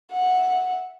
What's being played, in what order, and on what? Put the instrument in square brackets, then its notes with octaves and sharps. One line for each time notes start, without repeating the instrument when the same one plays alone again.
[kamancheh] E5 F#5